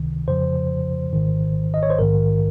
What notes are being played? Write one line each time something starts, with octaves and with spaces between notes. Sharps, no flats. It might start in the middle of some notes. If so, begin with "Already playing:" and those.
Already playing: C#2 C3 D#3
F2 C#3 F3 C5
G#1 G#2 D#3
D#5
C#5
C5
A#1 G#2 D#3 A#4